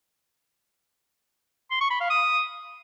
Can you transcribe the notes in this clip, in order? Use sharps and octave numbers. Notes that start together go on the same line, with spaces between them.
C6
C#6
B5
F5
D#6